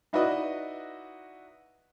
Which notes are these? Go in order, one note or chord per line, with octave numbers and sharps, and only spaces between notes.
D#4 E4 F#4 B4 D5 D#5